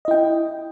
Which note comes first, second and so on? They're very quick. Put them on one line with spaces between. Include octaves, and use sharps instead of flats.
D#5 E4 G5